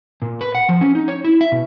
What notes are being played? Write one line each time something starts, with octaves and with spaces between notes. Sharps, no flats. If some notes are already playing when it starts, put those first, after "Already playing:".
A#2
B4
F#5
F3
C#4
D#4
C#5
E4
E5
B2